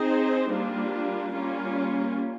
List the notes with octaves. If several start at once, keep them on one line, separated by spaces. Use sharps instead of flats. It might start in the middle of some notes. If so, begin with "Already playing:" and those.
Already playing: C4 D#4 G#4 C5
G3 A#3 D4 F4
G3 A#3 C#4 F4